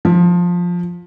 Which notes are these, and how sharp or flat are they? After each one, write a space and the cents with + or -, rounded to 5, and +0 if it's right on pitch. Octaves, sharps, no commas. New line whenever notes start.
F3 +10